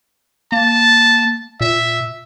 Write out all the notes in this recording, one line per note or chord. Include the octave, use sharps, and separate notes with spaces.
A#3 A5
A#2 E5